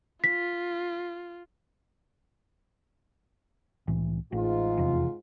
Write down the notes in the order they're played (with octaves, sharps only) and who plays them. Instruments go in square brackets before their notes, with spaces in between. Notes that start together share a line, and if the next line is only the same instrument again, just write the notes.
[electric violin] F4 [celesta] B6
[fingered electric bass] C2 A2 E3
[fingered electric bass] A1 [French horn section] G#2 F4
[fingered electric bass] F1 E2 C3